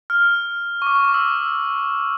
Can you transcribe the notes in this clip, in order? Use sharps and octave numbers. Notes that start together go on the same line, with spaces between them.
F6
C#6
D6
C#6
D6
E6